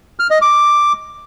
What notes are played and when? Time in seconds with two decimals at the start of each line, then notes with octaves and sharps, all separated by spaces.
0.20 F6
0.31 D#5
0.42 D6